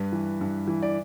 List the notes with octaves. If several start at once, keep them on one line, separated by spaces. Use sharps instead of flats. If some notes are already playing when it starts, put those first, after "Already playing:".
Already playing: G2 B4
E3
G2
E3
D5